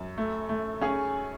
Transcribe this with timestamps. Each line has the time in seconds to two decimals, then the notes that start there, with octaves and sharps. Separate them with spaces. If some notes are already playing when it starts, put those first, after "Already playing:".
Already playing: F#2
0.18 A3
0.49 A3
0.81 C#4 G#4